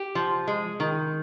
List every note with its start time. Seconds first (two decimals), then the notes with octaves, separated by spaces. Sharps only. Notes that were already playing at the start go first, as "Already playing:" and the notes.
Already playing: G4
0.15 F3
0.48 G#3
0.80 D#3